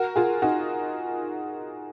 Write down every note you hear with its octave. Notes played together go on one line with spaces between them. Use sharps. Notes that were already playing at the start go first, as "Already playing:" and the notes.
Already playing: F#4 A#4
F4 G#4
D#4 F#4